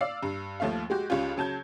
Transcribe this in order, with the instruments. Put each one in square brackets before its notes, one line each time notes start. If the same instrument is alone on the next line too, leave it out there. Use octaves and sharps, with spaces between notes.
[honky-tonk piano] D5 F5 E6 C7
G2
D#2 F3 A3 E5 F5
G#3 F#4 G4
C#2 G3 C#4 F4
C#3 F#3 A5 G6 G#6